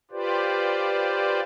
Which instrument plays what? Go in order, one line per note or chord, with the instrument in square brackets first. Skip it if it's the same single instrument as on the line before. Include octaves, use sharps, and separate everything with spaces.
[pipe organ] F4 G4 B4 C5 D5